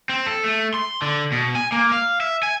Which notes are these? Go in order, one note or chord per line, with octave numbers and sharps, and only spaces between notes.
C4
A4
A3
C6
D3
B2
G#5
A#3
F5
E5
G#5